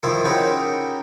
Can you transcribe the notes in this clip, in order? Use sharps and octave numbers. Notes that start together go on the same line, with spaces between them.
D#3 F3 E4 F4 A#4
C#3 D#4 F#4 G4 A#4 B5